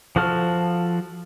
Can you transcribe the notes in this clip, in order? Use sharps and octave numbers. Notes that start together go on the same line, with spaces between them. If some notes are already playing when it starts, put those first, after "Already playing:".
F3 F#4 A4 F6